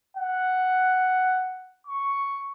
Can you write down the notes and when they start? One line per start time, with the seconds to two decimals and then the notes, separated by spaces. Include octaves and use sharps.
0.17 F#5
1.87 C#6